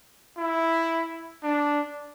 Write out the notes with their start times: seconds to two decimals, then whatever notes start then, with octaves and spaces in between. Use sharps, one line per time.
0.38 E4
1.43 D4